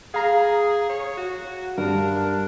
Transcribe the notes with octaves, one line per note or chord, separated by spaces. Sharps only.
G#4 F5 A#5
C#5
F#4
G2 D4 A#4